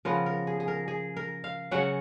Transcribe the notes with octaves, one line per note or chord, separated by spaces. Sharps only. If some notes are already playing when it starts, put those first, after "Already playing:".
C#3 F3 B3 A#4
A#4
G#4
G#4
A#4
G#4
A#4
F5
C#3 F#3 C#4 F#5